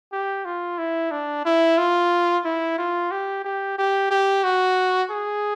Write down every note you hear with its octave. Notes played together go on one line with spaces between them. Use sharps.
G4
F4
E4
D4
E4
F4
E4
F4
G4
G4
G4
G4
F#4
G#4